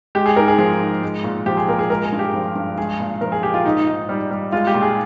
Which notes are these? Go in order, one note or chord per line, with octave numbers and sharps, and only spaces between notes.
G#3 G4
G#4
G#2 A#4
G#4
F3 G#4
G#2
G#3
A#2
F3 G4
G#4
A#2 A#4
G#4
G#3 A#4
G#4
G2
G4
F3
G2
G#3 G#4
A#2
F3 A#4
G#4
A#2 G4
F4
G#2 D#4
G#2 D#4
G3
G3
G#3 F4
G4
A#2
G#4